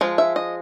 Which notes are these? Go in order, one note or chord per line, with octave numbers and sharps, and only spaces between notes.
F3 G#3
E5
D#5